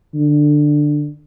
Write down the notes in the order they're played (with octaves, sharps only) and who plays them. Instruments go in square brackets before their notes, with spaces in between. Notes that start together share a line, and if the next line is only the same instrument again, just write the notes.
[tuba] D3